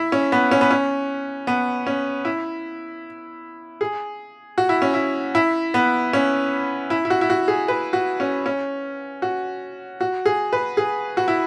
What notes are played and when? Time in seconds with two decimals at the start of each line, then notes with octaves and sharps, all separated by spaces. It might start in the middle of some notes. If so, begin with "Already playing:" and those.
Already playing: E4
0.12 C#4
0.32 B3
0.51 C#4
0.61 B3
0.71 C#4
1.47 B3
1.87 C#4
2.25 E4
3.81 G#4
4.58 F#4
4.69 E4
4.82 C#4
4.94 E4
5.35 E4
5.74 B3
6.13 C#4
6.90 E4
7.05 E4
7.10 F#4
7.21 E4
7.30 F#4
7.48 G#4
7.68 B4
7.93 F#4
8.20 C#4
8.46 C#4
9.22 F#4
10.01 F#4
10.26 G#4
10.53 B4
10.77 G#4
11.17 F#4
11.28 E4